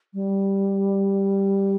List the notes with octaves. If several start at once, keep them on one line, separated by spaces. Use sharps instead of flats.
G3